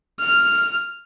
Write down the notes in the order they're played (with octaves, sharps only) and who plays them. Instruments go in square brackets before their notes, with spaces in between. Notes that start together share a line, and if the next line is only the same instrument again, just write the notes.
[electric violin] F6